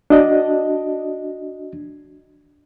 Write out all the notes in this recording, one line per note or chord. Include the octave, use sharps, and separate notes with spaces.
D4 F#4 D#5